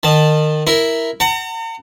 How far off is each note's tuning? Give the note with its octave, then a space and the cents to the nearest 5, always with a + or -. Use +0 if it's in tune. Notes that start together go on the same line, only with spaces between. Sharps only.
D#3 -25 A5 +0
E4 +0 A#4 +0
F#5 +20 A#5 -45